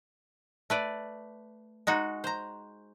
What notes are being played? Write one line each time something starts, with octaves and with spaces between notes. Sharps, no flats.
A3 B4 D5
G#3 D#4 F#4
C5 A#5